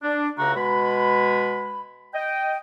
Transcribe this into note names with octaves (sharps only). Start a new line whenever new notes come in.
D4
C#2 C#3 A3 F#4 A#5
B2 G#3 B5
D#5 G5